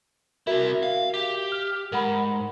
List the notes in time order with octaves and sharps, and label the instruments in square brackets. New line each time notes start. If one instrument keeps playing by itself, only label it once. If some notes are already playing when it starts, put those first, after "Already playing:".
[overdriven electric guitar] C3 E4 [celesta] F#4 A#4 E5
[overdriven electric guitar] F5
G4
[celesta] F6
[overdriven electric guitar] G#2 [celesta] A#4 F#5 B5